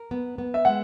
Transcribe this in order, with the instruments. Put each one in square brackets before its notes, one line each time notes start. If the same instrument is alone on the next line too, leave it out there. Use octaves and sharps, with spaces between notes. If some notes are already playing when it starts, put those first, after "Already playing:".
Already playing: [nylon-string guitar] A#4
B3
B3
[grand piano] E5
[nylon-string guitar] G#3 [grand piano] F#5